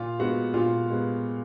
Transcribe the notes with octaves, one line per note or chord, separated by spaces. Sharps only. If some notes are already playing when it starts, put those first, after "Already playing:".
Already playing: A#2 F4 F5
G#3 B3 F#4 F#5
A#2 F4 F5
G#3 B3